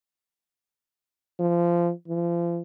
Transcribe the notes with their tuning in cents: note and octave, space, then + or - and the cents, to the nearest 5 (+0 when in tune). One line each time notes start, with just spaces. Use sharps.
F3 -20
F3 -35